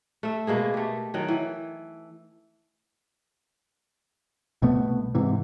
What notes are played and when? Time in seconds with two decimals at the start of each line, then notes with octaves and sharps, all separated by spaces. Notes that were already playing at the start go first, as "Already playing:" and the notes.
0.23 A3 E5
0.47 B2 G#3 A#3 G#4
0.74 A3 G4
1.14 D#3 F#3 G5
1.28 E3
4.62 C2 B2 A3 B3
5.15 G#2 C3 E3